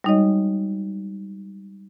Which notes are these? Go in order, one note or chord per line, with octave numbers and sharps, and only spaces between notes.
G3 G#3 D#4 F#4 C#5 D#5